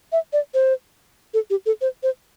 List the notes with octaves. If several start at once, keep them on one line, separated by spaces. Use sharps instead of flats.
E5
D5
C5
A4
G4
A4
C5
C5